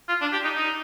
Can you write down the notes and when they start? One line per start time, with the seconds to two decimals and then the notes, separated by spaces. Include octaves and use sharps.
0.09 F4
0.21 D4
0.32 G4
0.44 D#4
0.56 D#4